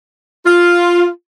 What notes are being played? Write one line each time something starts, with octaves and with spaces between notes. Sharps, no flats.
F4